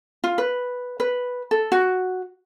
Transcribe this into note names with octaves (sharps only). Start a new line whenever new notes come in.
F4
B4
B4
A4
F#4